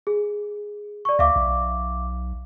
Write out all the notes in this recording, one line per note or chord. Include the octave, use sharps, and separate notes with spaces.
G#4
D5 C#6
D2 E5 F5 D6
B1